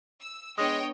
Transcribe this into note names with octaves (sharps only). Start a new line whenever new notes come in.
E6
G#3 B3 D4 C#5 D#5 G5 D#6